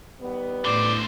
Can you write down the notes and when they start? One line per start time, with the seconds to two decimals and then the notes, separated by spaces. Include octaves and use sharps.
0.21 D#3 G3 B3
0.65 A2 D3 C5 D5 D#6